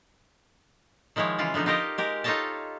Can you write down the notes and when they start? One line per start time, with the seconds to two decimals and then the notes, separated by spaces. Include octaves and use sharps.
1.16 D#3 F3 G#3 E4 C#5
1.39 C#3 E3 F4
1.54 D3 F3 B3 D#4
1.66 D#4 F4 G4 A#4 D#5
1.98 G#3 G4 A#4
2.24 D#4 F4 A4 C#5 D#5 A5